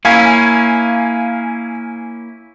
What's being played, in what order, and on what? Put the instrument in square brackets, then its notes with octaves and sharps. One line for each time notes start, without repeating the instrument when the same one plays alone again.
[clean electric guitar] A#3 C#4 E4 [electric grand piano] F5 G#5 G#6